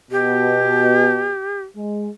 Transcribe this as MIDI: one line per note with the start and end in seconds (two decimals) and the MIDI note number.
0.11 1.34 47
0.11 1.62 67
1.77 2.09 56